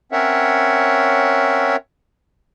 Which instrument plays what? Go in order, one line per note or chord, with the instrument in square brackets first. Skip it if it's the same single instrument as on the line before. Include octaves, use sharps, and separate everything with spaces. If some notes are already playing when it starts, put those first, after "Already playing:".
[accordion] C4 C#4 A#4 C#5 E5 F#5